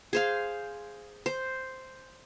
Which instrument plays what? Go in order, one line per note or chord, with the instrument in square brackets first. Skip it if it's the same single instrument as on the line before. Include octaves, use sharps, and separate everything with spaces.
[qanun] G#4 C5 F5
C5